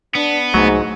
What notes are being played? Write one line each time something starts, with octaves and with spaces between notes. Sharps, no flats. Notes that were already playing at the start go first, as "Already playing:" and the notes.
B3 D4
C2 G#2 F#3 A3